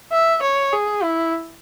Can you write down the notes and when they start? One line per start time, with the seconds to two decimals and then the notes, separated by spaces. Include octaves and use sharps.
0.12 E5
0.42 C#5
0.72 G#4
1.03 E4